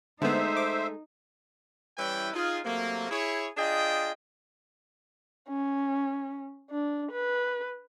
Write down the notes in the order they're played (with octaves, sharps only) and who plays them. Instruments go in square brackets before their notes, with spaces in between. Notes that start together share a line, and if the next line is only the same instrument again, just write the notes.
[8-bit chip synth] D3 B3 [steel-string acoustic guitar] G#3 A3 [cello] D#4 [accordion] C5 E5
[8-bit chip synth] D6
[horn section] E3 G3 C#4 E4 B4 G5
D#4 F4 G#4
C3 F#3 A3 A#3
E4 G#4 C#5
D4 F4 G#4 D#5 G5
[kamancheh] C#4
D4
B4